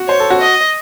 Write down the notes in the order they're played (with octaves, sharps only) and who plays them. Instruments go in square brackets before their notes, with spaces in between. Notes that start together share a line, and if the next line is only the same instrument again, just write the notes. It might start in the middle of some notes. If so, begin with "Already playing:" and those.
Already playing: [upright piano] F#4
[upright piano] C5 [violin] C#5
[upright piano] A4
F#4
[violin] D#5